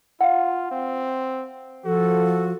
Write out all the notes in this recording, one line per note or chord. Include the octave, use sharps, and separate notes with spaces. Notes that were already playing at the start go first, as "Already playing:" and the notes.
F4 F5 F#5
C4
F3 F#4 A4